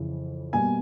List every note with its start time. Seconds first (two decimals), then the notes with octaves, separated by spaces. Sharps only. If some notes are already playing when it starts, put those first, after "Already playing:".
Already playing: F2 C#3 E3
0.53 B2 G3 A#3 G#5